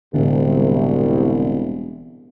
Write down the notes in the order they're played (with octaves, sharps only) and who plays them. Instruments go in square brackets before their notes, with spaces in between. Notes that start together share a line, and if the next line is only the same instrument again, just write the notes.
[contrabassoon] E1 [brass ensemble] C2 [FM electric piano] A2 D3